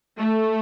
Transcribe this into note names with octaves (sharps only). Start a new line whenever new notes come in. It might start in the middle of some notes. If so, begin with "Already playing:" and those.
A3